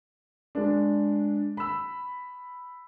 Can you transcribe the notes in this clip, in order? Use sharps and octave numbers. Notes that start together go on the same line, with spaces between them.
G#3 D4
B5 E6